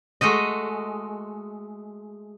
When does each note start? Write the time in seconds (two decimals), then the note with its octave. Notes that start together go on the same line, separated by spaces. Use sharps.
0.21 G#3 A3 F#4 D#5